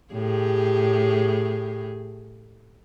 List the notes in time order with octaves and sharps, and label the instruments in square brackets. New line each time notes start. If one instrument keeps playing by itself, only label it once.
[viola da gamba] A2 G4 G#4